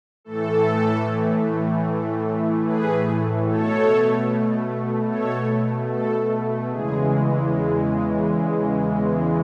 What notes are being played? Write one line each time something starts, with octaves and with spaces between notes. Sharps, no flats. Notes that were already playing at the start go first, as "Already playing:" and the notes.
A2 E3 A3 A4
G#4 B4
B2 A3 A4 C#5
A4 C#5
A4
E2 C#3 E3 G#3 G#4